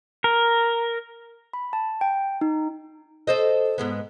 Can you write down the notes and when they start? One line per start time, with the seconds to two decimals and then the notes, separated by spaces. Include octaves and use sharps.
0.24 A#4
1.53 B5
1.73 A5
2.01 G5
2.41 D#4
3.27 A4 C5 D#5
3.78 G#2 G#3 B3